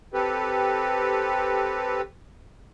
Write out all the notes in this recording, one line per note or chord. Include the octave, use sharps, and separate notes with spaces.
C4 G4 A4 B4